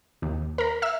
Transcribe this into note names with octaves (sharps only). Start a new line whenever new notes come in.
D#2
A#4 A#5
E5 E6